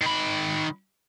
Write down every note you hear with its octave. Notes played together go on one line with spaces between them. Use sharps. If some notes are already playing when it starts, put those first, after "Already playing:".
D#3 B5